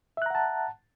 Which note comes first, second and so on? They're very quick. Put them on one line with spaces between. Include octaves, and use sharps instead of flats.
E5 F#6 A#5 F#5 A5